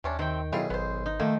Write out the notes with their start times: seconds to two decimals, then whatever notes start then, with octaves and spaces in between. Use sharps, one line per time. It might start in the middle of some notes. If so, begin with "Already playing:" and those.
0.04 D#2 C3 C#4 D4
0.19 C3 D#3 F#3 C4 G5
0.53 B1 G3 E4 F4 G#4
0.70 G#1 B3 C5
1.06 D#4
1.20 D#3 F3 A3 A#3